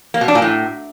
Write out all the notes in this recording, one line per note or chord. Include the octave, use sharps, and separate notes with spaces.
A#3
B2
D4
A#2
A2